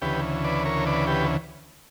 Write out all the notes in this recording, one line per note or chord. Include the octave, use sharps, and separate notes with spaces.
D2 C#3 E3 G4 B4
B4 D5
A#4 C#5
B4 D5
G4 B4